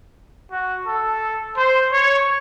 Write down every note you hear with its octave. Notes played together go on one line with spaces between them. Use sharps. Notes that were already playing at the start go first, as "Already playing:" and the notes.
F#4
A4
C5
C#5